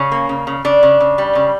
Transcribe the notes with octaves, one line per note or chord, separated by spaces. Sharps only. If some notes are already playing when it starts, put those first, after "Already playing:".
Already playing: C#3 C#4
A#3
C#3
C#3
C#3 D4
C#3
C#3
G3
C#3